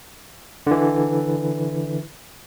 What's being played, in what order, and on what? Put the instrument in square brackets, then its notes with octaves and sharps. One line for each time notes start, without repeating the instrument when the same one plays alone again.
[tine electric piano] D3 E3